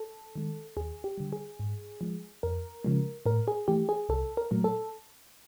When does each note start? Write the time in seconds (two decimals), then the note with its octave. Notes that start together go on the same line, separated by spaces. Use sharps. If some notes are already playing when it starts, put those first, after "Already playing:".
Already playing: A4
0.35 D#3 G#3
0.77 D#2 G#4
1.04 G4
1.18 D3 G3
1.33 G#4
1.60 G#2
2.01 F3 G#3
2.43 F2 A#4
2.84 C#3 F3 G#3
3.26 A2 A#4
3.48 G#4
3.68 E3 A3 G4
3.89 G#4
4.09 C2 A4
4.37 A#4
4.51 A#2 F#3 A3
4.64 A4